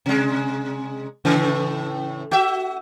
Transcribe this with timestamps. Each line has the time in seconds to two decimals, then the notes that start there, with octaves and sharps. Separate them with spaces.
0.06 C3 G#3
1.25 A2 C#3 E3
2.31 F#4 E5